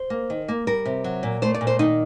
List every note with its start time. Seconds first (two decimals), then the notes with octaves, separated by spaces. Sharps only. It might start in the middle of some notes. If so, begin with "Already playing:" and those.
Already playing: C5
0.10 A#3
0.30 D#3
0.48 A#3
0.67 G3 A#4
0.85 C3
1.04 F#3
1.23 A#2
1.42 A3 C5
1.54 D5
1.61 A#2
1.67 C5
1.79 D#3 D#4